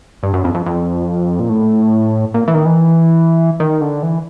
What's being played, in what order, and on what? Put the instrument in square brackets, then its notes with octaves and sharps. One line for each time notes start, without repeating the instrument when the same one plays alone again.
[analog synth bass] G2
F#2
F2
F2
F2
A#2
A2
A#2
E3
D#3
E3
D#3
D3
E3